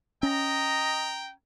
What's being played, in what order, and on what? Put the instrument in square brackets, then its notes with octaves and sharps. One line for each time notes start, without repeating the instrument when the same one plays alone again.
[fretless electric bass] C#4 [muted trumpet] D#5 [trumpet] G5 [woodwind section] A#5